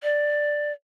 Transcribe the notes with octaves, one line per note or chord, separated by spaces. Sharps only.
D5